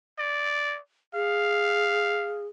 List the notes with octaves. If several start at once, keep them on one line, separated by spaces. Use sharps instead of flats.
D5
G#4 F5